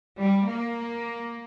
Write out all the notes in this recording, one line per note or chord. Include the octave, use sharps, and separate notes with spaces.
G3
A#3